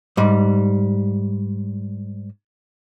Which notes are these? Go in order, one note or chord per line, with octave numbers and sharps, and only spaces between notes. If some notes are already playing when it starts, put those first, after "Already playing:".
G#2 G3